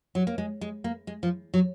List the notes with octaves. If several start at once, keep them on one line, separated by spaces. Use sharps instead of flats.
F#3
A#3
G#3
G#3
A#3
G#3
F3
F#3